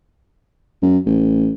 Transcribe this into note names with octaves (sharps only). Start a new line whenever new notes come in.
F#2
A1